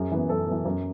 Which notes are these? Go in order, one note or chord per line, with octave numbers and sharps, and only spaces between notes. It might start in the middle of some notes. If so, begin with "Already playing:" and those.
Already playing: F#2 G#4
E3 B3
F#2 A4
E3 B3
F#2